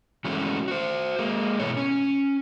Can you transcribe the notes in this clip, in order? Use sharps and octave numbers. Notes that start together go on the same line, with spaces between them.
E3 G#3 A3 C#4 F#4
F#4 C5
G#3 A#3
B2 E3 A3 B3 C#5
C#4